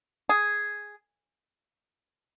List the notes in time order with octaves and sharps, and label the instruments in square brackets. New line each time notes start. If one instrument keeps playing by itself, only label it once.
[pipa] G#4